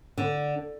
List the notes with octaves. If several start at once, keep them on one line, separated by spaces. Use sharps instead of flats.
D3